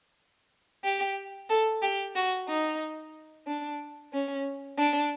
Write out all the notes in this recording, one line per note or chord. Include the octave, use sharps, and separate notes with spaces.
G4
A4
G4
F#4
D#4
D4
C#4
D4